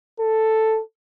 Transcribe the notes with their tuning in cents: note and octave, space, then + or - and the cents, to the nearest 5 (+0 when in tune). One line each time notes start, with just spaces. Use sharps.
A4 +5